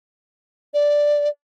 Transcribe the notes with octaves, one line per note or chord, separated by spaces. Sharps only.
D5